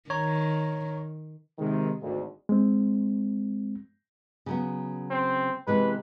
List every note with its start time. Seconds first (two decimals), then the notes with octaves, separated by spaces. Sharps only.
0.10 D#3 C#5 A#5
1.59 C3 D#3 G#3
2.02 G#1 D2
2.49 G#3 C4
4.46 C#3 F#3 B3
5.11 C4
5.67 C3 E3 G#3 B4